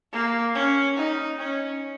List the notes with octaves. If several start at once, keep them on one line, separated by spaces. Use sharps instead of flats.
A#3
C#4
D#4
C#4